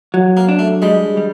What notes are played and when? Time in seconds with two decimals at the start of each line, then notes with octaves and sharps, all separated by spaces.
0.14 F#3
0.37 A#3
0.49 D4
0.59 A3
0.82 G3 G#3
1.17 G3